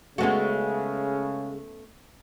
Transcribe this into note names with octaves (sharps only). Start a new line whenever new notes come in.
C#3 G#3 A3 B3 C#4 F#4